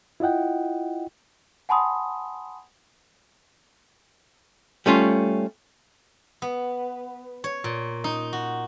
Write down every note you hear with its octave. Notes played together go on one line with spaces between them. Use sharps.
E4 F4 D#5 F#5 G5
F#5 G#5 A5 B5 C6 D#6
G3 A3 C#4 F4
B3
C#5
A#2
D#4
F#4